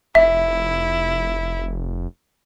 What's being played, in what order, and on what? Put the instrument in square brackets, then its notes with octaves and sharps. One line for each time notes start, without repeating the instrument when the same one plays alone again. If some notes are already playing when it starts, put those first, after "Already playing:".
[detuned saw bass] F1 [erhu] E4 [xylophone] E5